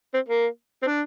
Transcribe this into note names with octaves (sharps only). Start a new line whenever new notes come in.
C4
A#3
C4
D4